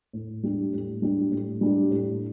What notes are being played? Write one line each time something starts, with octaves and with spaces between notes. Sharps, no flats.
A2
G3 D4 G4
A2
G3 D4 G4
A2
G3 D4 G4
A2